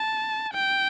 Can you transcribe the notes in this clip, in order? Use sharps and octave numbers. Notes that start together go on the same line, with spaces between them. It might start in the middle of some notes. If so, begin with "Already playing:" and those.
Already playing: A5
G5